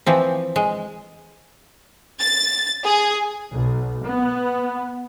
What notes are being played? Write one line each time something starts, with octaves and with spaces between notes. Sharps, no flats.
E3 F3 C4
G#3
A6
G#4
B1
B3